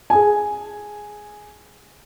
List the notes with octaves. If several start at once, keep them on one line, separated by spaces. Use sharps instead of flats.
G#4 G#5